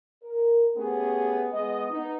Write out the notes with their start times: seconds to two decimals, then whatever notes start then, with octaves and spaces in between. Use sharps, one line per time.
0.22 A#4
0.76 A3 B3 C#4 G4 G#4
1.52 G#3 B3 D#5
1.89 B3 D#4